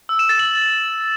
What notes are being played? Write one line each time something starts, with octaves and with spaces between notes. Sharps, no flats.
E6
E7
A6
F#7